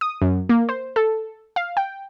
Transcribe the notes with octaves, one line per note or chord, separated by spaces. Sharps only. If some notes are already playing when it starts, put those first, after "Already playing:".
D#6
F#2
A#3
C5
A4
F5
G5